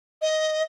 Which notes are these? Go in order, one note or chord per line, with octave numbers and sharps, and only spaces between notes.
D#5